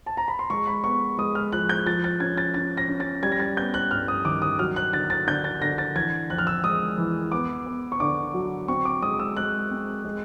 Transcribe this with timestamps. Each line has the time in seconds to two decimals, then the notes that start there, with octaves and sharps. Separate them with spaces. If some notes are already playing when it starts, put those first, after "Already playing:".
0.06 A5
0.17 A#5
0.28 B5
0.39 C6
0.50 G#3 C#6
0.67 B5
0.84 B3 C#6
1.18 G#3 D#6
1.35 F6
1.52 F3 F#6
1.69 G6
1.86 F3 A6
2.04 A6
2.20 C#4 G#6
2.37 A6
2.54 C#4 A6
2.77 A#6
2.88 C#4
3.00 A6
3.23 G3 G#6
3.32 A#6
3.40 A6
3.57 B3 G6
3.74 F#6
3.91 G2 F6
4.08 D#6
4.25 D#3 D6
4.42 D#6
4.59 F#3 F6
4.76 F#6
4.93 D3 A6
5.10 A6
5.27 D3 G6
5.44 A6
5.61 D3 A#6
5.78 A6
5.96 E3 G#6
6.30 F2 F#6
6.38 F6
6.47 E6
6.64 G#3 D#6
6.98 E3
7.31 B3 D6
7.66 B3
7.92 C#6
8.00 D3 D6
8.34 F#3
8.68 C4 C#6
8.85 D6
9.02 G#3 D#6
9.19 E6
9.37 G#3 F#6
9.71 C4
10.04 G#3